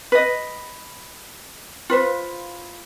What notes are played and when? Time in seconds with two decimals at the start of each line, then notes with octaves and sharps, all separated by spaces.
0.12 B4 D#5
1.90 F4 B4 C5